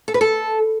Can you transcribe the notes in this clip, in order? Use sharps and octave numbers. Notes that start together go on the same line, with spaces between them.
A4
B4
A4